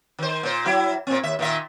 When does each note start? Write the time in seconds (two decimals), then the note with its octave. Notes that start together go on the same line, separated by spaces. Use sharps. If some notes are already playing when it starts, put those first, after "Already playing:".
0.19 D#3 C5
0.43 A#2 C5
0.65 F#3 E4
1.07 A#2 C4
1.23 D#2 E5
1.39 A#2 D#3 E5